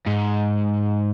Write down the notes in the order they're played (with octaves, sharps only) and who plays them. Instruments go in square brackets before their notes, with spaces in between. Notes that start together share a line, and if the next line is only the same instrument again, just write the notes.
[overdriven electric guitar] G#2